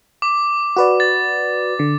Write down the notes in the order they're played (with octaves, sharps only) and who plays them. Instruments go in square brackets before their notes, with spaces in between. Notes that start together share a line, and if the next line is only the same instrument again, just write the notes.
[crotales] D6
[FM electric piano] F#4 B4 D5
[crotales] A6
[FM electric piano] D3